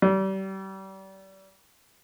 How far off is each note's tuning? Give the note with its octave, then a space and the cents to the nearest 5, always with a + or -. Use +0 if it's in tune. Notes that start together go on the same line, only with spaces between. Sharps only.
G3 -30